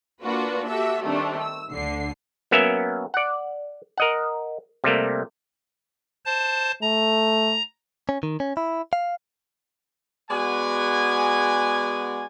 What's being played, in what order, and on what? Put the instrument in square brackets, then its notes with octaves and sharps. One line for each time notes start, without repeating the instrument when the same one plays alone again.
[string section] A#3 D4 F4 F#4 B4
F#4 G4 A4 E5
D#3 G3 A3 C4 D4
E6
D2 D3 C7
[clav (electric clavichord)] F#3 A#3 B3 C#4 A#4 E5
D5 F#5
A#4 D#5 F#5
C3 G3 A3 A#3
[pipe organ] C5 A5
[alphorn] A3 [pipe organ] A#5
[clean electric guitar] C#4
D#3
C#4
E4
F5
[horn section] G#3 B3 F#4 D5 G#5